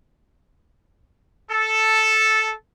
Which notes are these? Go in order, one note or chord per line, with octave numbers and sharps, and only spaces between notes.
A4